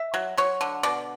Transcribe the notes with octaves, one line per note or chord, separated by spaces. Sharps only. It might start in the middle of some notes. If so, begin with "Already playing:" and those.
Already playing: E5
F#3
F#3 C#5
D3
B2 D5